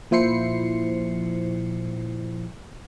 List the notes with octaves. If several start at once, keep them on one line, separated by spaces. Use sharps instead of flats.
A#2 F3 E4 C5 C7 C#7